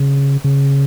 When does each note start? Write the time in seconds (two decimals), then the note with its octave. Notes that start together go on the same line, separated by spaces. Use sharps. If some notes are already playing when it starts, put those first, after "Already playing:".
Already playing: C#3
0.44 C#3